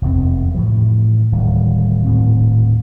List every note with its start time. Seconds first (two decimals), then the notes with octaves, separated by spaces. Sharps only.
0.02 F1 E2 C4
0.55 A2 E3 F3
1.32 D1 D#3 G3
2.05 D#1 A2 C4